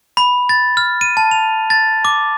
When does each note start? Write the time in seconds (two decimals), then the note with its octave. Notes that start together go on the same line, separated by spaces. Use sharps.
0.17 B5
0.49 A6
0.77 F6
1.01 D#7
1.17 A5
1.31 F7
1.70 A6
2.05 D6